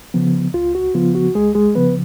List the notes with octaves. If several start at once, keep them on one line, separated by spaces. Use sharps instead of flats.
C#3 F3 B3
C#2 F4
F#4
C#3 F3 B3 F4
F#4
C#2 G#3 G#4
G#3 G#4
C#3 F3 B3 B4